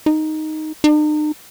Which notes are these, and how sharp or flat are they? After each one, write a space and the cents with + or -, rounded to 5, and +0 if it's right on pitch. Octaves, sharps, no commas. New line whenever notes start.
D#4 +0
D#4 -45